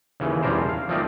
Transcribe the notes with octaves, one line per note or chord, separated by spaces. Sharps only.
D#2 C#3 E3
E2 G3 C#4 D4 A#4 C5
F5
F3 A3 A#3 C4 D#4 D5